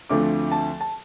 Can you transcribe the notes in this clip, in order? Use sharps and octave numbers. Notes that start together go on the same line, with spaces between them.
D2 D3 F3 A3 C4 D6
A5
A5